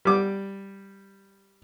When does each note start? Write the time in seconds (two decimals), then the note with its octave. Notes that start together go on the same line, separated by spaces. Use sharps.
0.05 G3 D6